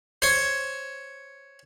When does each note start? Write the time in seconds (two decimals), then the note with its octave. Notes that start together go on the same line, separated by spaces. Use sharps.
0.22 C5 C#5